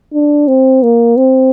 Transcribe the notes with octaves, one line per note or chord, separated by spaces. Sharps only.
D4
C4
A#3
C4